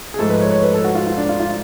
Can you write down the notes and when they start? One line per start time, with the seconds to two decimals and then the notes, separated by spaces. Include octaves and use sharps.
0.14 G#4
0.19 G#2 F3 A3 A4
0.30 B4
0.41 C#5
0.52 C#5
0.63 B4
0.74 A4
0.84 F#4
0.95 F4
1.07 F4
1.18 D4
1.29 F4
1.40 F4